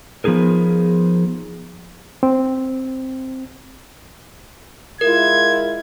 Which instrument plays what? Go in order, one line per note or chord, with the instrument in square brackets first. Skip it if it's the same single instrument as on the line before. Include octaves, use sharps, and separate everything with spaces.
[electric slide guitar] F3 B3 D#4 G#4 A#4
[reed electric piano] C4
[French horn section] G#3 E4 [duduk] F4 [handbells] A#4 [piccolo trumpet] G#6